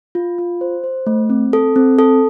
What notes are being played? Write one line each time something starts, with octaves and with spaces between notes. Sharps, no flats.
F4
F4
C5
C5
A3
C4
A4
C4
A4